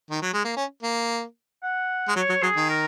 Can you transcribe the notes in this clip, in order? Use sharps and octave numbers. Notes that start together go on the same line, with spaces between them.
D#3
F#3
G#3
A#3
C#4
A#3
F#5
G#3
F#3 C#5
F#3
F#3 G#4
D#3
A#4